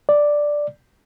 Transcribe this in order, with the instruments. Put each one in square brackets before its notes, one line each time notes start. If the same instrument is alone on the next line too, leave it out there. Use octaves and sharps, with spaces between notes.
[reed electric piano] D5